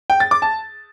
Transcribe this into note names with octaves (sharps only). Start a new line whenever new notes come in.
G5
A6
D6
A5